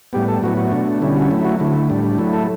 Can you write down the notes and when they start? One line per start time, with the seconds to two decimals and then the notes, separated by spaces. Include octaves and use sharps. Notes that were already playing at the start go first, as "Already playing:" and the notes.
0.13 A2 G3 B3 G4
0.28 A4
0.43 A2 F#3 B3 E4 F#4
0.58 F#4
0.71 B2 A3 D4
1.01 D3 G3 C#4 E4
1.16 F#4
1.31 F#3 A3 E4
1.45 F#4
1.60 D3 A3 E4
1.90 A2 G3 D4
2.18 F#3 A3 E4
2.33 A4